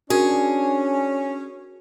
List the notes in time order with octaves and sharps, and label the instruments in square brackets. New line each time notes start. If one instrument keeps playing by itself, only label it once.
[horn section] C#4 [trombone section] D4 [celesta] F#4 A#4 [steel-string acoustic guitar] G#4